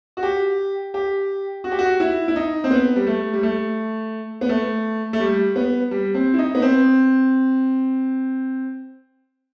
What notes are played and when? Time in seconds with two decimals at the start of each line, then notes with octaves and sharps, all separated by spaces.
0.17 F#4
0.23 G4
0.94 G4
1.64 F#4
1.72 G4
1.79 F#4
2.00 E4
2.28 E4
2.36 D#4
2.64 C4
2.71 B3
2.96 G3
3.07 A3
3.33 G3
3.43 A3
4.41 B3
4.49 A3
5.13 A3
5.20 G3
5.56 B3
5.91 G3
6.14 C4
6.34 E4
6.38 D#4
6.55 B3
6.62 C4